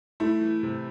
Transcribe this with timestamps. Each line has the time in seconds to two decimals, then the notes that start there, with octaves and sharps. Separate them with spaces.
0.20 A3 E4
0.41 E3
0.63 C3